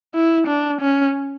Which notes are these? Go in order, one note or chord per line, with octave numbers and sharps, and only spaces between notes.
E4
D4
C#4